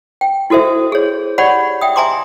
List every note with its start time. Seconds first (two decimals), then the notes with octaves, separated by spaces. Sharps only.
0.21 G5
0.50 E4 F#4 A4 C5 E5
0.92 G#4 C#5
1.38 G4 C#5 D5 F#5 B5
1.81 E5 G5 D#6
1.96 E5 G#5 A#5 C6 D6